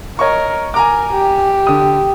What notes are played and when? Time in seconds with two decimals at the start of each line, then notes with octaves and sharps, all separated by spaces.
0.19 A#4 C#5 D#5 C#6
0.74 A#4 G#5 A#5 D6
1.13 G4
1.67 D3 D#6